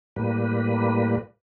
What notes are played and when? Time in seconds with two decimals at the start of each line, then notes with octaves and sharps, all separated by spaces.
0.16 A2 G3 A#3 B4